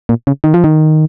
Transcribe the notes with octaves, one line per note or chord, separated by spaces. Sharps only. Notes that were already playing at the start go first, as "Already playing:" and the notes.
A#2
C#3
D#3
F3
D#3